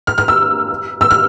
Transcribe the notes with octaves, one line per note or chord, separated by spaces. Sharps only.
F6
F6
E6
E6
F6